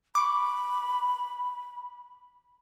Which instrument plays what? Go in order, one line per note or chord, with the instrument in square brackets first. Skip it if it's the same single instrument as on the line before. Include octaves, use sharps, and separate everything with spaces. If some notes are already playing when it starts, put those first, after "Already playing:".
[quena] B5 [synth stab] C#6 D6